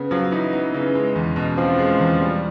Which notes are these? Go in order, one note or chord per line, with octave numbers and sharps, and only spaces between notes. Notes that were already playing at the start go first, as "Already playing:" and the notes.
Already playing: C#3 B3
F3 F#3
E3 D#4
B3
C#3
G#3
E2
B2
F3 C4
G#3
E2
G3